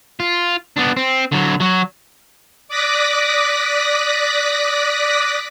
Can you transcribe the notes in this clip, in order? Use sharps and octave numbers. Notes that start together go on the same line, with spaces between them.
F4
B3 D4
C4
D3 F#3
F#3 F#4
D5 D6 D#6 F#6 A#6 B6